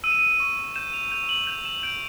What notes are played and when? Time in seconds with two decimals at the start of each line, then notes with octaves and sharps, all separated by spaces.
0.04 E6 D#7
0.12 E7
0.19 D#7
0.40 C#6
0.76 G6 E7
0.93 F7
1.12 G6 F7
1.29 F#7
1.47 G6 F7
1.65 E7
1.83 G6 D7